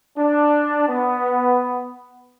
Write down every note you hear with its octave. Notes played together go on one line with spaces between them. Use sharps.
D4
B3